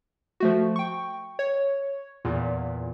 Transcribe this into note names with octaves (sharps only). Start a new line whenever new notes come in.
F3 A3 F#4
G5 C#6
C#5
E2 A#2